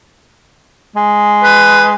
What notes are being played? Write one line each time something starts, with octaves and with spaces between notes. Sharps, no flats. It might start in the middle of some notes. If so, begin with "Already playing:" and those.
G#3
B4